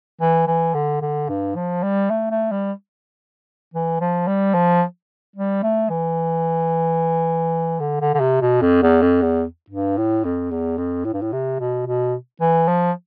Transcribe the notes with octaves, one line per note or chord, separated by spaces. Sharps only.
E3
E3
D3
D3
G2
F3
G3
A3
A3
G3
E3
F3
G3
F3
G3
A3
E3
D3
D3
D3
C3
B2
F2
E2
F2
E2
G2
A2
F2
E2
F2
A2
G2
A2
C3
B2
B2
E3
F3